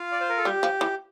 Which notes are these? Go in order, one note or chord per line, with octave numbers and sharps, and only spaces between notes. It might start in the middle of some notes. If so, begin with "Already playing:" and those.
Already playing: F4 F5
D5
C5
A#4
A4
G3 G4
F3
E3